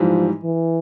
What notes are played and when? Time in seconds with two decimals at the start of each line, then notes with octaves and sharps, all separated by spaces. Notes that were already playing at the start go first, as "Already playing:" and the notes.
Already playing: G#2 E3 F3 G3
0.44 E3